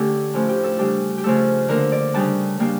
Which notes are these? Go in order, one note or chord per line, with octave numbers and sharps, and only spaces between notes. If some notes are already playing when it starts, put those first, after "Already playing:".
Already playing: D3 A3 C#4 G4 A4
A2 F3 A3 C#4
G4
A4
C#3 G3 D4 G4
G4
C#3 F3 A3 D4 A4
D3 F3 A#3 A#4
D5
C#3 G3 D4 A5
C#3 G3 A#3 D4